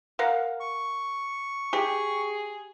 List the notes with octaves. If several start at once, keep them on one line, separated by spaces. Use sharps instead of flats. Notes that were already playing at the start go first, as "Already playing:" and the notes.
A#4 F5 F#5
C#6
G4 G#4